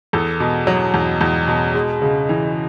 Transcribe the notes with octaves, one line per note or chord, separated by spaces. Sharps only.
E2 A4
B2
F#3
E2
E2
B2
G#3
C#3
E3